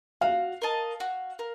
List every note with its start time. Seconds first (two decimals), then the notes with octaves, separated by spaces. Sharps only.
0.21 F#4 F5
0.62 A#4 D#5 A5
1.00 F#4
1.39 A#4